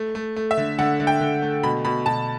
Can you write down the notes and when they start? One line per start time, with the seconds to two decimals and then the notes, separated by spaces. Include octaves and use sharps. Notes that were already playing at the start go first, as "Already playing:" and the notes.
Already playing: A3
0.15 A3
0.36 A3
0.51 E5
0.57 D3
0.79 D3 F#5
1.00 D3
1.07 G5
1.21 D3
1.42 A3
1.63 B2 B5
1.85 B2 B5
2.06 B2 A5